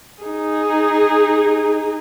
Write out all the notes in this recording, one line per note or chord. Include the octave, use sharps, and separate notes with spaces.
D#4 G#4